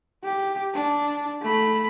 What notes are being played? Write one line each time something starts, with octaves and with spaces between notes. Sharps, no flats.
G4
D4
A3 B5